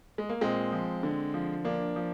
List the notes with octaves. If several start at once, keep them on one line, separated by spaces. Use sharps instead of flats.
G#3
A#3
A#2 G#3 C4
F3
D3
F3
F3 A#3 D4
F3